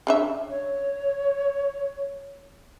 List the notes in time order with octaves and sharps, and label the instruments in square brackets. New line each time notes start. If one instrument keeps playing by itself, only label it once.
[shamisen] C#3 D4 E5
[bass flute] C#5